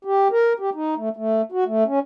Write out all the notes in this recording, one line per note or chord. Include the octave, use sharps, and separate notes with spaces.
G4
A#4
G4
D#4
A3
A3
F#4
A3
C#4